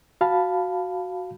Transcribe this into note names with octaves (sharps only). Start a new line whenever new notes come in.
F#4 F5 A5 B5